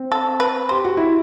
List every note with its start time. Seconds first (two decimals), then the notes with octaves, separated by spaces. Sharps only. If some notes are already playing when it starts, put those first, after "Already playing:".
Already playing: C4
0.12 A4
0.40 B4
0.69 G4 C5
0.85 F#4
0.97 E4